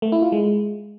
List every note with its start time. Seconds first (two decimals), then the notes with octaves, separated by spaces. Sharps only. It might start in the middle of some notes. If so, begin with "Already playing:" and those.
0.02 A3
0.12 E4
0.22 F4
0.32 G#3